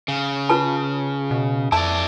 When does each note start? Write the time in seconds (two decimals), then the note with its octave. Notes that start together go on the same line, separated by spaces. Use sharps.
0.08 C#3
0.49 F4 B4 A5
1.31 B2
1.72 F2 E4 D5 A5